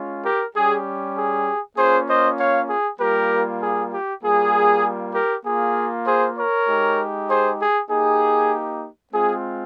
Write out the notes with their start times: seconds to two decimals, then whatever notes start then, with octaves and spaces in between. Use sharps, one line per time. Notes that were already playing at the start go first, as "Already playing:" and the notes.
Already playing: G#3 C#4 F4
0.24 G4 A#4
0.54 G3 C#4 G4 G#4
1.16 G#4
1.77 A#3 C#4 F4 G#4 C5
2.08 C5 D#5
2.38 C#5 F5
2.69 G#4
2.99 G3 A#3 F4 G4 A#4
3.61 G#4
3.92 G4
4.23 G3 A#3 F4 G#4
5.14 G4 A#4
5.45 A#3 F4 G#4
6.06 G#4 C5
6.37 A#4 C#5
6.68 G#3 D#4 G4
7.29 G#4 C5
7.60 G#4
7.90 A#3 D#4 G4 G#4
9.13 G#3 C4 F4 G#4